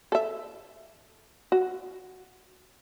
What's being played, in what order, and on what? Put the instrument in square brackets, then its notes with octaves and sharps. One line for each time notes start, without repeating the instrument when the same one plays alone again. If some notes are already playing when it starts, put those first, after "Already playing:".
[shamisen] A4 E5
F#4